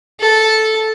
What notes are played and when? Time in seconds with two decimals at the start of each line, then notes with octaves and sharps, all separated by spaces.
0.20 A4